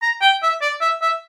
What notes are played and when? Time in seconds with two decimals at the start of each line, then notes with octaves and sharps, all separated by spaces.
0.02 A#5
0.22 G5
0.43 E5
0.62 D5
0.81 E5
1.02 E5